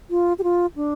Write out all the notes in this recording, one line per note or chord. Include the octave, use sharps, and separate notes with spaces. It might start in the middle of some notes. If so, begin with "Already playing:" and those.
F4
G4
F4
D4